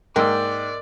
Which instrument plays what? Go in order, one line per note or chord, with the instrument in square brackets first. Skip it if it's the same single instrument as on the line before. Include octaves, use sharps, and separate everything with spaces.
[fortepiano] G#2 A#3 G5 [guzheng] A#4 [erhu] D5 [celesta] D#5 C6 E6